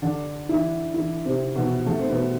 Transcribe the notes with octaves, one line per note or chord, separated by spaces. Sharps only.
D3 D4
E3 E4
E3 E4
C3 C4
B2 B3
A3
C4
B2 B3